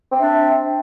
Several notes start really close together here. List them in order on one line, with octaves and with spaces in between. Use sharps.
C4 D4 E5